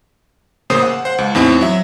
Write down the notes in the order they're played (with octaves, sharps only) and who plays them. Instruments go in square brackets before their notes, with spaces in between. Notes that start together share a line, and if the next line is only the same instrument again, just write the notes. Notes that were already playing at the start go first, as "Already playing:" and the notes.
[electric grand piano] A1 C#3 A#3 C5 D#6
F#5
C5 F#5
C#2
E2 A2 C4 D#4
F#3 E5